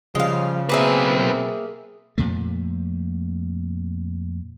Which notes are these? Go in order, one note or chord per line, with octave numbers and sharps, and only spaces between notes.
C#3 F3 G3 G#3 F5
B1 B2 A#3 C4 G#4 B4 E5
F2 A#2 A3